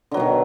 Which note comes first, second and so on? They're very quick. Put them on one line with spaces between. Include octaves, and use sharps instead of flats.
D3 F#3 B2 D#3